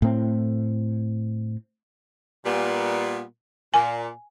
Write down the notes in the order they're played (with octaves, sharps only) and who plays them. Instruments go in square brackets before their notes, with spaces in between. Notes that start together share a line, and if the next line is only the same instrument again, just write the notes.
[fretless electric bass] A2 C4
[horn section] A#2 G3 B3
[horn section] A#2 [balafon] G#5